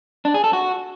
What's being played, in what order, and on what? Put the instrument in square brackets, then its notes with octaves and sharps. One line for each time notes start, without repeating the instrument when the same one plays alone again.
[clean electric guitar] D4
G#4
A4
F#4